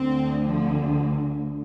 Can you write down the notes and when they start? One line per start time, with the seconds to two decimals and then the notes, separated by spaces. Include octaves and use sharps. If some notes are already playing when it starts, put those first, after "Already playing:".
Already playing: D2 D3 C4
0.44 F3